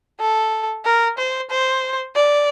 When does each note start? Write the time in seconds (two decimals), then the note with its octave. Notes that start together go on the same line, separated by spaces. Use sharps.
0.20 A4
0.85 A#4
1.18 C5
1.50 C5
2.15 D5